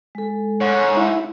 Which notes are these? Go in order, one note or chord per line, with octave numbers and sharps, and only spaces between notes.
G#3 A4
G#2 C#5
E4